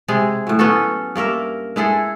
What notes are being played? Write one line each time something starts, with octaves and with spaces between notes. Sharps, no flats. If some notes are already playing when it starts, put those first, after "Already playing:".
C3 G#3 G#4
A2 F#3
B3 C#4 F#4 A4
G2 A#3 A#4 E5
G#3 E4 G#4 A4